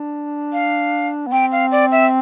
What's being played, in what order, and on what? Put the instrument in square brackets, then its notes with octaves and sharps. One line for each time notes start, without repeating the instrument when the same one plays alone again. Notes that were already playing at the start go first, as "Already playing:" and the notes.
Already playing: [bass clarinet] D4
[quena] F5
[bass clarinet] B3
[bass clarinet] C4 [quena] G5
[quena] F5
D5
E5